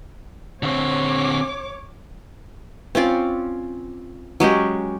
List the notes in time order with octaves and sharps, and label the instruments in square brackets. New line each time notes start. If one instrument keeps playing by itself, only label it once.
[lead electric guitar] D3 C4 [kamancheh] C#5 D6
[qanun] C4 C#4 F4 D5
F#3 G#3 C#4 G4